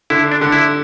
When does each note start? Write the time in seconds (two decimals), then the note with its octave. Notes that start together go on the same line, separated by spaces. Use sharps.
0.10 D3 E4
0.32 D4
0.41 D3
0.52 E4